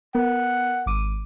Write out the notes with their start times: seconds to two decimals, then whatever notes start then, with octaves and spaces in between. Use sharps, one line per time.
0.15 B3 A#4 F#5
0.86 G#1 D6 D#7